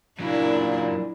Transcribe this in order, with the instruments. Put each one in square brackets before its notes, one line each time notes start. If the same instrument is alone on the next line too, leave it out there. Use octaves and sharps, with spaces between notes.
[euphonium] A#2 [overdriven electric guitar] F#3 A#3 [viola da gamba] D4 E4